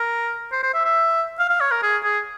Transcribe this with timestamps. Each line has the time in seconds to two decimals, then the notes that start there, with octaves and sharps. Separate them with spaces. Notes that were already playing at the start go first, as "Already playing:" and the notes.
Already playing: A#4
0.52 C5
0.63 C5
0.74 E5
0.85 E5
1.39 F5
1.50 F5
1.61 C#5
1.72 A#4
1.83 G#4
2.04 G#4